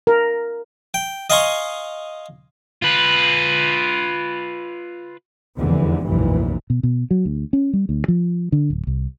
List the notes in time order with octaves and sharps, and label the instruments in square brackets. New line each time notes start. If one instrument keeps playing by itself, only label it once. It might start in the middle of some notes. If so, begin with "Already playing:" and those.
[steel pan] A#4
[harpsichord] G5
D#5 F5 G#5 A#5 C6 C#6
[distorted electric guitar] F4 B4
[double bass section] F1 E2 D3 E3
F1 B1 G2 A#2 E3
[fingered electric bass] B2
B2
F#3
D2
C#4
G3
D2
F3
D3
D1
C2